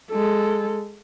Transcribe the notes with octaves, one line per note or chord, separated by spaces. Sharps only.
G#3 A4